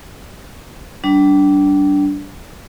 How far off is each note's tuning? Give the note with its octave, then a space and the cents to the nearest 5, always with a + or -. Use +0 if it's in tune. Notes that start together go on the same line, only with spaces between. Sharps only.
G3 -25 D4 -15